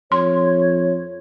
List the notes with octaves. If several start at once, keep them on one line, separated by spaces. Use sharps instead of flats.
F2 C#5 C6